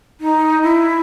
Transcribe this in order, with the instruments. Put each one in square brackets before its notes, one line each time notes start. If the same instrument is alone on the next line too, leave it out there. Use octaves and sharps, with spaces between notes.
[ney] D#4
E4